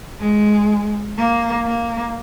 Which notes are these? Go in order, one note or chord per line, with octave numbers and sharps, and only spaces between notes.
G#3
A#3
A#3